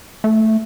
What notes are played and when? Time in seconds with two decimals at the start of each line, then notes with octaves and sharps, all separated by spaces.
0.24 A3